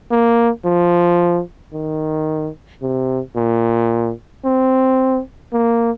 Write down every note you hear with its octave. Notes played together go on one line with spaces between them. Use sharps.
A#3
F3
D#3
C3
A#2
C4
A#3